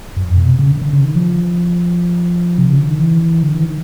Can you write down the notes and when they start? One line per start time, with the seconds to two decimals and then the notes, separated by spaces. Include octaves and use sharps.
0.17 F#2
0.24 F2
0.37 B2
0.47 C3
0.59 C#3
0.70 D3
0.81 D3
0.93 C#3
1.04 D#3
1.15 F3
2.58 C3
2.68 C#3
2.78 D3
2.88 D#3
2.98 E3
3.43 D3
3.54 E3
3.66 D#3